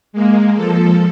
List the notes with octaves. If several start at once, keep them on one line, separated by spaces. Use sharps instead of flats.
G#3 A#3
F3 A4